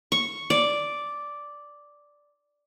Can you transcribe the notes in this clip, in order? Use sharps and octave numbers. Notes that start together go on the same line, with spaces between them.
C#6
D5